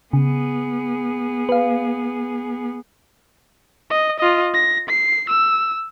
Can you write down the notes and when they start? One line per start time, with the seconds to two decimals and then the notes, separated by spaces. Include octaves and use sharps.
0.13 C#3 B3 G#4
1.49 B4 F5
3.90 D#5
4.20 F4 D#5
4.54 A#6
4.89 C7
5.30 E6